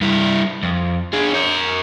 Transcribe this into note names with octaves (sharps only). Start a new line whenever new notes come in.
G2 E4
F2
D4 G#4
A#4 C#5